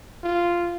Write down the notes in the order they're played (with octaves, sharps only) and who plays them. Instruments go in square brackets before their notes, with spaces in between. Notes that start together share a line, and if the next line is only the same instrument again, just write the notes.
[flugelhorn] F4